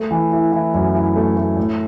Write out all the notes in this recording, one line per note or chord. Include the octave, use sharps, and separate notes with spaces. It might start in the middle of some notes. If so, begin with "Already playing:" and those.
Already playing: A3
E3
E4
E3
F#2
E4
A3
A3
A2